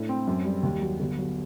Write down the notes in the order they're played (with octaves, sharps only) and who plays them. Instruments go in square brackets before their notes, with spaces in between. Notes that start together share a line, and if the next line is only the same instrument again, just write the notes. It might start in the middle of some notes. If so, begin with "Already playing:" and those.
Already playing: [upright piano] A2 D4
C4
F#2
G3
D#2
F#3
G1
F#3